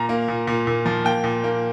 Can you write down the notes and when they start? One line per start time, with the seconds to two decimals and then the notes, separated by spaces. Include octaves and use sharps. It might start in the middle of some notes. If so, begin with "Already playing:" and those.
Already playing: A#2 A#5
0.09 A#3
0.28 A#2
0.47 A#2
0.67 A#2
0.86 F3
1.05 A#3 G5
1.24 A#2
1.44 A#3